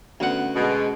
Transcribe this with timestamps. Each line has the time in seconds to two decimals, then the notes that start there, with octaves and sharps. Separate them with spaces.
0.20 D2 B3 C#4 B4 F#5
0.56 B2 G#3